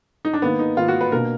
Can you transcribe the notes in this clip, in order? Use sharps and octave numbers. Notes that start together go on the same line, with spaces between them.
D#4
D4
G#2 D#3 A#3 B3
D#4
G#2 D#3 A#3 F4
F#4
B4
B2 A#3 D4 A#4